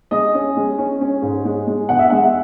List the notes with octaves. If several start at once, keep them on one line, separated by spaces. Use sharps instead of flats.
G#3 D#5
C#4
G#3
C#4
C#4
G#2
G#3
G#3
E2 F#5
E5
G#3 F#5